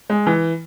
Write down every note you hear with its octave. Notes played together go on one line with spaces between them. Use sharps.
G#3
E3